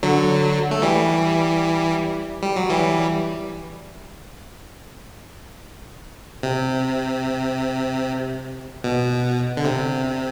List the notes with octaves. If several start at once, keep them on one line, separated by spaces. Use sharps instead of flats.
D3 F#3
A3
E3 G3
G3
F#3
E3 G3
C3
B2
D3
C3